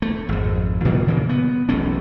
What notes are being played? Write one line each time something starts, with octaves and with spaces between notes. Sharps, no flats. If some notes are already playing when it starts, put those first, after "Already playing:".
A3
G#1 F2
A#2 D#3 G3 B3
C#3 E3 A#3
B3
E1 B1 A3 C#4